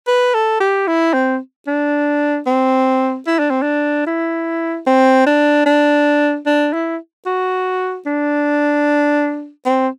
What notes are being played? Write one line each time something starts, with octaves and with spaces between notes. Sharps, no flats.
B4
A4
G4
E4
C4
D4
C4
E4
D4
C4
D4
E4
C4
D4
D4
D4
E4
F#4
D4
C4